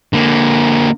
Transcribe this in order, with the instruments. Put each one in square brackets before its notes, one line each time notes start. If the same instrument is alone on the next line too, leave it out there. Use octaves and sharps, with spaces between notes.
[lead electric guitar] D3 A#3